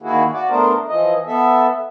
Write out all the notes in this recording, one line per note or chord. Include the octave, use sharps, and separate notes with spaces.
D#3 A#3 E4 F#4 G#4
F#4 D5
A3 B3 D4 A#4 C5
E3 F3 D#5
B3 A4 E5